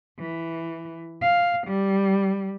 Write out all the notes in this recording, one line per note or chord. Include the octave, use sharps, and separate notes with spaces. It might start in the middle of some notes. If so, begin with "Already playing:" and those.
E3
F5
G3